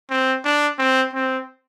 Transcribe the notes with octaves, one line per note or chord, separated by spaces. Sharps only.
C4
D4
C4
C4